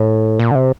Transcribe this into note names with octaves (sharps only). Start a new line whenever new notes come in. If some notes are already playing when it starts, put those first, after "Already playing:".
Already playing: A2
A#2
D3
C3